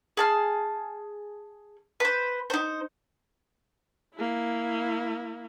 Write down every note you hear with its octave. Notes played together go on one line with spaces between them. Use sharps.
G#4 A5 F6
B4 C5
D#4 C5
A#3 E4